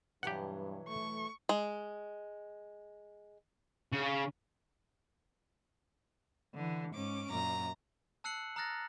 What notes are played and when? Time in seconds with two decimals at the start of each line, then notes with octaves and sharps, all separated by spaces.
0.23 G2 B2 E3 F#3 G4 F#5
0.88 A3 C#6
1.49 G#3
3.92 C#3
6.55 D3 E3
6.94 G#2 C#4 D6
7.30 F#2 A#2 A#5
8.24 A5 E6 F#6 C7 C#7 F#7
8.56 A#5 D#6 F6 F#6 A6 A#6